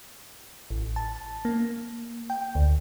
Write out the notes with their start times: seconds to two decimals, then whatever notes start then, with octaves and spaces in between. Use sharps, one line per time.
0.70 A1
0.96 A5
1.45 A#3
2.30 G5
2.55 D2